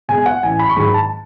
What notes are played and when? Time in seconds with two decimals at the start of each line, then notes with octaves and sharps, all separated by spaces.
0.08 B2 G#3 G#5
0.26 F#5
0.43 A1 G#5
0.59 B5
0.69 C#6
0.76 G#2 D#3 F#3 B5
0.94 A5